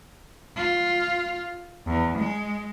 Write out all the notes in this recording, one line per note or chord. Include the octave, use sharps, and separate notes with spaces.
F4
E2
G#3